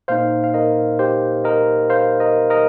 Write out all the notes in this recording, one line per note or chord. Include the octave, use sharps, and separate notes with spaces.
A#2 A#3 D#4 C5 F5
F5
A#4 D#5
G4 C5
A#4 D#5
C5 F5
A#4 D#5
A#4 D#5